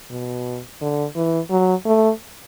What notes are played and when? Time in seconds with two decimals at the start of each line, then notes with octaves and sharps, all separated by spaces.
0.10 B2
0.81 D3
1.16 E3
1.50 F#3
1.86 A3